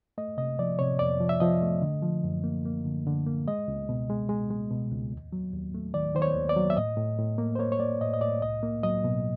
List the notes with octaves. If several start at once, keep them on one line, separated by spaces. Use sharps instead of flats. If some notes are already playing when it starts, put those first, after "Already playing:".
A3 D#5
C3 D#5
F3 D5
C3 C#5
F2 D5
F3
E5
F3 D#5
A3
D3
F3
F#2
A#3
A#3
D3
D3
A#3
G#3 D#5
C#2
B2
G#3
G#3
G#3
B2
C#2
D#2
F#3
D#2
A3
D#3 D5
D#3 C5
C#5
D#2
D5
F#3
E5
A2 D#5
A2
A2
A#3
C5
A#3 C#5
C#5
A#3 D5
A2 D#5
D#5
A2 D5
C2 D#5
A#3
F#3 D#5
B2